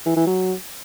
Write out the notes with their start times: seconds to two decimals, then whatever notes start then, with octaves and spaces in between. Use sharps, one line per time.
0.06 E3
0.16 E3
0.27 F#3